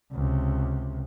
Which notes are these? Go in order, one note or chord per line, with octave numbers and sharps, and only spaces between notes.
C#2 C3